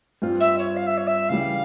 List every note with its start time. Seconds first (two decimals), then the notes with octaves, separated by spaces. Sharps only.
0.22 G2 G3 C4 F4
0.40 E5
0.58 C#5
0.76 F5
0.87 E5
0.97 C#5
1.07 E5
1.29 C#3 E3 G3 F5